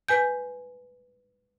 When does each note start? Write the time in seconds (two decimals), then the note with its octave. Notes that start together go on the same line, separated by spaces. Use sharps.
0.08 B4 G#5 G6